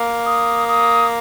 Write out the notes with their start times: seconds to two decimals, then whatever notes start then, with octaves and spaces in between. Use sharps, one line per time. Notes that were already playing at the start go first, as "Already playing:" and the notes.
Already playing: A#3
0.26 D#6
0.68 D#6